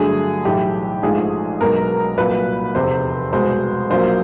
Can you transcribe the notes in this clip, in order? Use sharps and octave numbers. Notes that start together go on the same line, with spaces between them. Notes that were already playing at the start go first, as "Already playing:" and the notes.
Already playing: G2 D3 F#3 A3 G#4
B1 A2 E3 G4
A#1 G#2 F3 A3 G#4
B1 B2 G#3 B3 A#4
C2 A#2 F#3 B4
F1 E2 C3 C5
C2 B2 G#3 B3 C5
A#1 A#2 F#3 A#3 C5